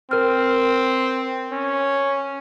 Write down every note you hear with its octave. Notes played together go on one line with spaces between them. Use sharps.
C4 A#4 F6
C#4